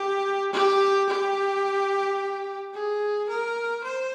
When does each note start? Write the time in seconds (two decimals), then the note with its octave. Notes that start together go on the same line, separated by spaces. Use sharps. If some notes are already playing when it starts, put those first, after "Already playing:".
Already playing: G4
0.53 G4
1.09 G4
2.74 G#4
3.29 A#4
3.84 C5